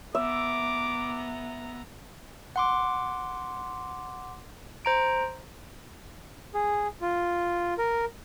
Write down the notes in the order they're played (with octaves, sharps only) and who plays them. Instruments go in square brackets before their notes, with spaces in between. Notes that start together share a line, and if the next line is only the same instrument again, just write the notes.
[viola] B3 A#5 [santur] E5 [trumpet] D6
[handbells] F#5 C6 D6
C5 A#5 D7
[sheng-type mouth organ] G#4
F4
A#4